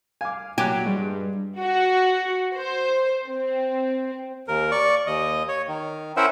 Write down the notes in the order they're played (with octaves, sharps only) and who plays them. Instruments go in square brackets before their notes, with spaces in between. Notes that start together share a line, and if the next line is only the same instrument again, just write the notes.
[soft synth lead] F5 [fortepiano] G#5 D6
[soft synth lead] A#2 [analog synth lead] F#3 [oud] G4 [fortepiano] G#5 D6 F#6
[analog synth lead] G2 [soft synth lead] G3 [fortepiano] G#3
[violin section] F#4
C5
C4
[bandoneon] D#2 A#4
D5 C#6
D#2 D#5
C#5
D#3
C#4 E4 A#4 C5 E5 F#5